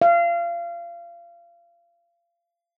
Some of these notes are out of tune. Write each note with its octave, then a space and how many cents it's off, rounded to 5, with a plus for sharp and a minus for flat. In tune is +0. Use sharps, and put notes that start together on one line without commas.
F5 -30